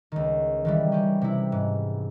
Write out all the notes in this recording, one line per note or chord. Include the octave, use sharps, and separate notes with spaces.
C#2 D#3
D#3 E3 G3
C#4 G4
C3 E4
G#2